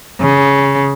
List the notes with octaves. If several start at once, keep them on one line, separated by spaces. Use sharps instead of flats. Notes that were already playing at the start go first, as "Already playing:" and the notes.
C#3